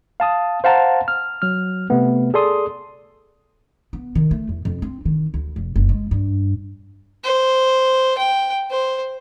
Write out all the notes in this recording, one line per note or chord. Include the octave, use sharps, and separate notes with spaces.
F5 A5 D#6
C5 F5 F#5 A5 A#5
F6
F#3 F6
C3 A3 B3
G#4 A4 D5 C6 D#6
B3
D#3
A3
E2
F2
C4
D#3
D2
F1
F#1
G#3
G2
C5
G5
C5